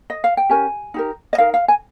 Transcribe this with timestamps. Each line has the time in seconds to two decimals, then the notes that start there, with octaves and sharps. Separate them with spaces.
0.10 D#5
0.24 F5
0.37 G5
0.50 C#4 G4 A#4 G#5
0.94 D#4 G4 A#4
1.33 D#5
1.38 D#4 A#4 F5
1.54 F5
1.68 G#5